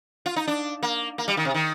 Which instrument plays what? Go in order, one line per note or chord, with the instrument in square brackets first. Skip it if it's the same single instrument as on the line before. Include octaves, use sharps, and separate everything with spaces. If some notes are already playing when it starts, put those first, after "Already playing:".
[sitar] F4
D#4
D4
A#3
A#3
G3
D#3
C3
D#3